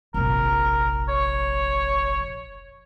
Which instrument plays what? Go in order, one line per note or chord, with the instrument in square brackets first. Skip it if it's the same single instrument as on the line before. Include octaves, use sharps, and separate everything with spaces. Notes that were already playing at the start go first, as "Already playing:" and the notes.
[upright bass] F1 A#1 [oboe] A#4
[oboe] C#5